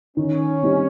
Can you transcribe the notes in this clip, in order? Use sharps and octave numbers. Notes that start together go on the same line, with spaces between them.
D#3 C#4
G3 C4 D#4